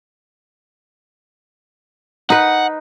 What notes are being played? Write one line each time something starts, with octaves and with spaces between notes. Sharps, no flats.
D#4 B4 F#5